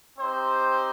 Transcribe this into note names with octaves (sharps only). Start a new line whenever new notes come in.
C4 D#4 G4 C5